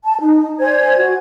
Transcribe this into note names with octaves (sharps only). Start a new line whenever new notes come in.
A5
D#4
C5 D5 G#5 G#6
F#4